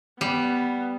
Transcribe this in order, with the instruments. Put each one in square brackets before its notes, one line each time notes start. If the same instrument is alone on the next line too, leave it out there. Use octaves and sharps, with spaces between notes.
[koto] G3 [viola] B3